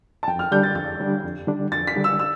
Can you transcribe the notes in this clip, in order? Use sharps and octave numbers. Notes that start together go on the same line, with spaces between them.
A5
F2 G5
F6
D3 G3 D4 G6
A6
F2 A6
D3 G3 D4
F2
D3 G3 D4
F2 A6
B6
D3 G3 D4
E6
E6